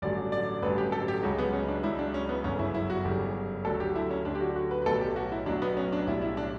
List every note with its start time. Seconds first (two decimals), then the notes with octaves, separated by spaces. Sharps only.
0.02 A1 G2 D3 F#3 D5
0.32 D5
0.62 A1 G2 D3 F#3 B4
0.78 G4
0.92 A4
1.08 G4
1.23 C#2 C#3 F#3 F#4
1.38 B3
1.53 C#4
1.68 D4
1.83 C#2 C#3 F#3 E4
1.99 D4
2.14 C#4
2.29 B3
2.44 G1 F#2 C#3 C#4
2.59 E4
2.74 E4
2.90 F#4
3.05 G1 F#2 C#3 G4
3.65 D2 D3 F#3 A4
3.80 G4
3.95 E4
4.10 C#4
4.25 D2 D3 F#3 D4
4.35 G4
4.41 F#4
4.56 F#4
4.71 B4
4.82 B4
4.86 B1 A2 F#3 A4
5.01 G4
5.16 F#4
5.32 E4
5.46 B1 A2 F#3 D4
5.62 B3
5.77 C#4
5.92 D4
6.07 B1 A2 G3 E4
6.22 E4
6.37 D4